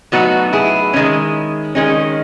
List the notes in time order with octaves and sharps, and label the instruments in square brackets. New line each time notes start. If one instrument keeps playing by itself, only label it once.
[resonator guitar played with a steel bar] A2 F#3 B3 D#4 F#4
E4 G#4
D#3 G#3 C#4
D#3 G#3 C#4